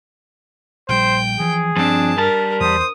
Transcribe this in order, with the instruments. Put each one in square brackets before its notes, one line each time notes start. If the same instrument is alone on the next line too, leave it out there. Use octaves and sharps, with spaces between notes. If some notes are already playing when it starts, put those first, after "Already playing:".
[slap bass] A#1 G3 [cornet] C5 [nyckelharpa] G5
[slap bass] E3 F3 [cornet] G#4
[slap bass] G2 [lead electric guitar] F3 C4 [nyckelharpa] D4 A5
[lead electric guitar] G3 A5 [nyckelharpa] A#4
[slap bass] E2 [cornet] C5 [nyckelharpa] D#6